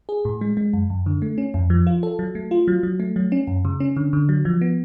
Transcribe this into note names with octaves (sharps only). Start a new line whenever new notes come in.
G#4
A2
G#3
G#3
F#2
F#2
D3
A3
C#4
F2
F3
F4
A4
F#3
A3
F4
F#3
F#3
A3
F#3
C#4
F#2
C#3
C#4
D3
D3
F#3
F3
B3